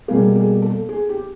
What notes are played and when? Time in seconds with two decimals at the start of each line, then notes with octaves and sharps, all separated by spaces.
0.08 B2 G3 A#3 G#4
0.25 A4
0.35 G#4
0.62 A4
0.89 G#4
1.09 G4